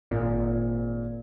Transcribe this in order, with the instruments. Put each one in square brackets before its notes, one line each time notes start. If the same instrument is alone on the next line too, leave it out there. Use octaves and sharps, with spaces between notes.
[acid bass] G#1 [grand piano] A#2